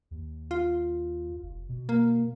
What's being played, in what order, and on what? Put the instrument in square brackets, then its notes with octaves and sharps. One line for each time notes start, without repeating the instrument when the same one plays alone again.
[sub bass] D#2
[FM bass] F4
[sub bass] F1
B2
[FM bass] A#3